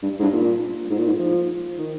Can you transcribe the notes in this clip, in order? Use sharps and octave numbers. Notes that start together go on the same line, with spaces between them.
G2
G#2
G2
A#2
G#2
A#2
G#2
F3
D#3